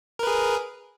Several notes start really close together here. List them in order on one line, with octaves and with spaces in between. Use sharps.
A#4 B4 G#4